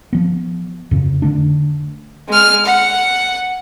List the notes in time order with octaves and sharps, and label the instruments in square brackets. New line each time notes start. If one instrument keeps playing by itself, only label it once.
[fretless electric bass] F3 B3
F2 C#3
D3 A3 D4
[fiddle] G#3 F6
F#5